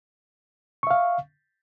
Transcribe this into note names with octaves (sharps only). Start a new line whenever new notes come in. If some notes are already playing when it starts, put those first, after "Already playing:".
E5 F5 C#6